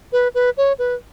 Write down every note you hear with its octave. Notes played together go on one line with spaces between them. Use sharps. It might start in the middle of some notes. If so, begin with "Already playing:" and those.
B4
B4
C#5
B4